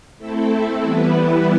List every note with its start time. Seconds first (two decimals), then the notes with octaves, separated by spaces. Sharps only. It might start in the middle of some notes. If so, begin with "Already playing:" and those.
0.18 A3 C4 E4 A4
0.81 E3 G3 B3 E4 B4